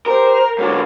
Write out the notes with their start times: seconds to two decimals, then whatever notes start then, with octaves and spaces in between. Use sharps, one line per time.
0.06 G4 A#4 C5
0.59 G#2 D3 F#4 A#4 C#5